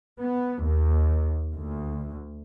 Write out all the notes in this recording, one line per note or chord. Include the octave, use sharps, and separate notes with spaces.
B3
D#2
D2